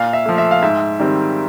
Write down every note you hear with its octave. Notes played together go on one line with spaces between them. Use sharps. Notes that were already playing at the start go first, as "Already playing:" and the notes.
Already playing: A#2 F5
E5
F3 A3
E5
F5
G#2 E5
D#3 G3 C4